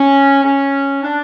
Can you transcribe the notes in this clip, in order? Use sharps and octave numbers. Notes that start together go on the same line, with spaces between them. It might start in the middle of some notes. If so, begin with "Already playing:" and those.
Already playing: C#4
C#4
D4